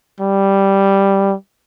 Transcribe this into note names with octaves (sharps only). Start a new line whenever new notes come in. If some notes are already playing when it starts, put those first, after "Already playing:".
G3